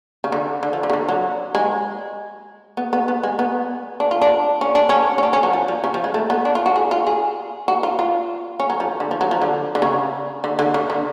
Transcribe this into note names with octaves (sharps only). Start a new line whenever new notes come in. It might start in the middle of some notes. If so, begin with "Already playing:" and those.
C#3
D3
D3
F3
D3
C#3
D3
F#3
G#3
B3
B3
B3
G#3
B3
D4
F4
D4
C#4
D4
C#4
C#4
D4
C#4
F#3
F3
F3
C#3
F3
G#3
A3
B3
D4
F4
F#4
G#4
F4
G#4
F#4
F4
F4
C#4
F#3
F3
D3
F3
F#3
F3
D3
D3
C#3
D3
D3
C#3
D3